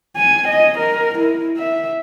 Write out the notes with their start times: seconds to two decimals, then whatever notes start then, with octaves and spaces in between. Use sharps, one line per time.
0.17 G#5
0.48 D#5
0.78 A#4
1.19 E4
1.58 E5